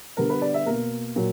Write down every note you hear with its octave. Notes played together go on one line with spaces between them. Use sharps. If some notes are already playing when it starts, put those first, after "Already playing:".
D3 G3 B3 A#4
B4
D5
E5
B2 A#3 A#4
A#2 F#3